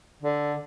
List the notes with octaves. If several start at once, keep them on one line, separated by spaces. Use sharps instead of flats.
D3